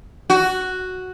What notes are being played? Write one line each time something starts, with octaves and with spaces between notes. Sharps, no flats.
F#4